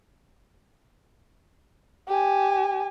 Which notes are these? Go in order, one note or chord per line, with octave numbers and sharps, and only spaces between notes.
G4 G#5